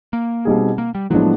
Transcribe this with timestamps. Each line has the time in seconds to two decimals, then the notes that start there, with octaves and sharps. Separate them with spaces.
0.13 A#3
0.45 B2 G3 C4 D#4 G#4
0.78 A#3
0.95 G3
1.10 A2 F3 F#3 G#3 B3 D4